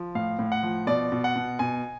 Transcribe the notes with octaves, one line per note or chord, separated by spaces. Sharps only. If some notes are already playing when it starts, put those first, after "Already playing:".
Already playing: F3
A2 F5
A2
F#5
F3
B2 D5
B2
F#5
B2
B2 G#5